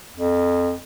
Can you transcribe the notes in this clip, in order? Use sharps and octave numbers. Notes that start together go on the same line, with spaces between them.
F2